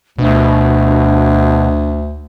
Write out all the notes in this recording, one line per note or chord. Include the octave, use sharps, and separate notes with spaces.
D2 B2 D4